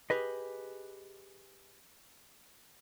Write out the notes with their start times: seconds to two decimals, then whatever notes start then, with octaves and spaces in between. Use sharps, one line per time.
0.10 G4 G#4 B4 D#5